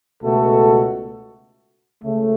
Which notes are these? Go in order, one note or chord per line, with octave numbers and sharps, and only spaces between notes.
C#2 B2 A3 F#4 A4
C#2 C#3 A3